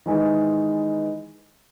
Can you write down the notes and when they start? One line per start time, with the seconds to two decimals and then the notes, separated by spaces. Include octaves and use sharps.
0.06 D#3 E3 G#3